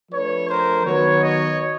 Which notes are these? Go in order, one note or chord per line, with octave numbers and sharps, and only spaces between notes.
F3 A3 D4 B4 C#5
A#4 C5
D#3 F#3 B3 B4 C#5
C#5 D#5